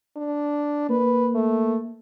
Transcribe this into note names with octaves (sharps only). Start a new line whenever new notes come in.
D4
A#3 B4
A3